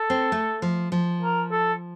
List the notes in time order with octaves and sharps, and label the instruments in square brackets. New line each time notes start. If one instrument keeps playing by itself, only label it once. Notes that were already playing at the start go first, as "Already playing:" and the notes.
Already playing: [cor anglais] A4
[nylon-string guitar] C4
A3
F3
F3
[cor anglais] A#4
A4